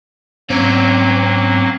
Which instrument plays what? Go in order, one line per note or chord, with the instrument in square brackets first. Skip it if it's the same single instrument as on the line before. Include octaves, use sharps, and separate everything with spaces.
[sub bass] G#2 [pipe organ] F#3 A#3 [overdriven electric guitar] C4 C#4